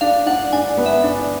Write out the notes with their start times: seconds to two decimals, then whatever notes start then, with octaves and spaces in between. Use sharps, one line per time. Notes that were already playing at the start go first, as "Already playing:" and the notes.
0.01 D4 F5
0.26 D4 F#5
0.53 D4 G#5
0.78 B3
0.86 E5
1.03 D4